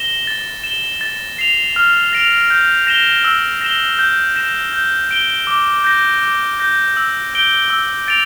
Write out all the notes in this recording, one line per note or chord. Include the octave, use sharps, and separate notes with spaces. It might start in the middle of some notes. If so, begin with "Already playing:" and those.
Already playing: A#6 E7 G7
A6
E7 G7
A6
C7 F7
F6
A#6 D7 F7
G6
A#6 E7 G7
E6
A#6 E7 G7
G6
A#6 E7
G6
D7 G7
D6
G6 A#6
D6
G6 A#6
E6
G6 D7 G7
E6
A6 D7 F7